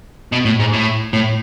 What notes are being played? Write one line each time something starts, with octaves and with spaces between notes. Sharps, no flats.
B2
A2
G#2
A2
A2